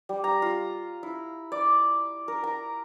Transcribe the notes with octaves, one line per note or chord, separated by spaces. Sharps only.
G3
A#5
F4
E4
D5
A#4
A#5